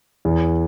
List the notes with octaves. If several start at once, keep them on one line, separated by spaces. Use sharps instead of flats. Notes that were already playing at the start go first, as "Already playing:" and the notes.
E2